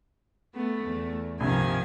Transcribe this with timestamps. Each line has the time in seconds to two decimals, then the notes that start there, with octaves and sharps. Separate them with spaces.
0.55 A3 B3
0.85 E2
1.40 C2 G2 C3 D#3 F3 G#5